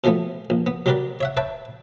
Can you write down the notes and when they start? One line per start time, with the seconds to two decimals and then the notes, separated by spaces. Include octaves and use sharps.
0.04 B2 E3 F3 A3 B3
0.50 A#1
0.66 B3
0.86 F#3 G3 G4 A#4 B4 D5
1.21 C#5 E5 F#5
1.37 B4 C#5 E5 G5 A5